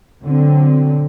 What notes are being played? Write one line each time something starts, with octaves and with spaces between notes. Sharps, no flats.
B2 D3 F#3 C4